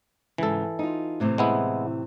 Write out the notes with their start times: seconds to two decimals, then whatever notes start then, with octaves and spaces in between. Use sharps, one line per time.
0.38 G#2 C#3 E3 A4
0.79 D#4 F4
1.20 A2 C3 E3
1.38 G#3 B3 E4